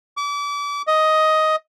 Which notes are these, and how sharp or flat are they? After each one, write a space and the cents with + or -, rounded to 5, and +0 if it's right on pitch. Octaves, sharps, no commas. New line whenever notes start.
D6 -35
D#5 +10